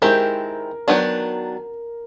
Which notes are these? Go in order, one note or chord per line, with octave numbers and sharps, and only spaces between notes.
D#3 G#3 C4 E4 G4 A#4
D#3 F#3 B3 D4